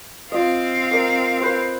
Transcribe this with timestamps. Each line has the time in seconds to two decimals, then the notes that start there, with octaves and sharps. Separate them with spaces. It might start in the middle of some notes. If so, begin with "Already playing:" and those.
0.32 C4 F4 D#5 F5
0.91 A#4 D#5 D6
1.41 B4 C5